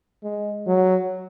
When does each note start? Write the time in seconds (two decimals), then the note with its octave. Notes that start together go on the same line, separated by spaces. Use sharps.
0.23 G#3
0.67 F#3